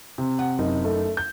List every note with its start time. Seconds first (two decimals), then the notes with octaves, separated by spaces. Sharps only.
0.18 C3
0.39 F#5
0.58 F#1 D#4
0.85 A3
1.17 G6